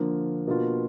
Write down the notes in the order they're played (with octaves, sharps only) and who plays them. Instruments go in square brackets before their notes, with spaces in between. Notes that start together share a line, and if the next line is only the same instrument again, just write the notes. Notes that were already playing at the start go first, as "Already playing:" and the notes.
Already playing: [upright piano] D3 F3 A#3
B2 A#3 D4 F4